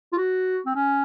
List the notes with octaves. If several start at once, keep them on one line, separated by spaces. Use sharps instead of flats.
F4
F#4
C4
C#4